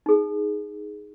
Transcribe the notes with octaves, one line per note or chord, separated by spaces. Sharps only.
D#4 G#4